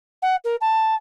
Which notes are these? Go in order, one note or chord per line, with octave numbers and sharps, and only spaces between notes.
F#5
A#4
A5